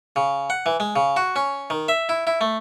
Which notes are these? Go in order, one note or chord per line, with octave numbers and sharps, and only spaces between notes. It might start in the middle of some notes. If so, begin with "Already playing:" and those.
C#3
F#5
E3
G#3
C#3
F#4
C#4
D#3
E5
E4
E4
A3